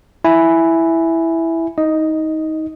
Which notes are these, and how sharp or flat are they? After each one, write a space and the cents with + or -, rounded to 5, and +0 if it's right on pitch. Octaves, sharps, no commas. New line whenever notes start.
E4 +0 G#5 +0
D#4 +25 D#5 +0